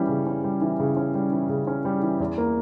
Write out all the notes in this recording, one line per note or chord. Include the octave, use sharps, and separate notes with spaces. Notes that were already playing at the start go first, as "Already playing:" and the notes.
Already playing: E3 G3 C#4
C#3
C#4
G3
E3
C#3
C#4
G3
E3
C#3
C#4
G3
E3
E2
A#3